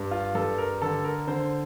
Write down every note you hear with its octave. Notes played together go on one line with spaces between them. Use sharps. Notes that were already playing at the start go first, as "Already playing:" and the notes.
Already playing: G2
F4
G2 A4
A#4
D3 A4
A#4
D3 C5